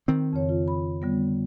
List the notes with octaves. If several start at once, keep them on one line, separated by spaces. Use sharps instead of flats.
D#3 C4
F2 C#3 C#5
F4
B5
D3 G3 B3